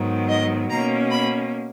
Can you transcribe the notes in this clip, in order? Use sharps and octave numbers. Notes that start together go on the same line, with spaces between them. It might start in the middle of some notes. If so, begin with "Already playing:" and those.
Already playing: G#2 D#3 F#3 B3
D#5
B2 A#3 C#4 A#5
B5